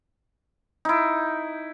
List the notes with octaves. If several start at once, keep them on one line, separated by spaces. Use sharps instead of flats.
D#4 E4